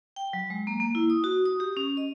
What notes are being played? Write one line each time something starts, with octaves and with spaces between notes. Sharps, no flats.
G5
F#3
G#3
A#3
A#3
E4
D#6
F#4
D#6
G4
C#4
D#5